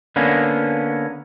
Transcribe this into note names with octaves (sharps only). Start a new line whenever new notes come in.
D3 A#3 B3 C#4